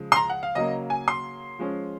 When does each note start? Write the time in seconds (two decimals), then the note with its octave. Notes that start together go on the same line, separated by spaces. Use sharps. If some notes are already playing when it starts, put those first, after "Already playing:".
Already playing: C#3 F3 G#3
0.12 C6
0.16 A#5
0.30 F#5
0.43 F5
0.55 C#3 F#3 A#3 D#5
0.90 G#5
1.08 C6
1.59 F3 G#3 C#4